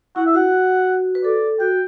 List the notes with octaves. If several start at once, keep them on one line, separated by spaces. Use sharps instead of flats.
E4 F#5
E5
F#4 F#5
B4
A4 D5
F#4 G5